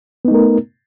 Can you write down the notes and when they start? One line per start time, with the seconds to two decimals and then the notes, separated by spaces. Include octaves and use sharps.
0.25 B3
0.28 D#4
0.31 A3
0.35 A#4